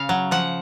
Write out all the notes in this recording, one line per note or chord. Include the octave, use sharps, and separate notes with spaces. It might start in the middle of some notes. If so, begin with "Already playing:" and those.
Already playing: C#3 F5
F#3
F3 F#5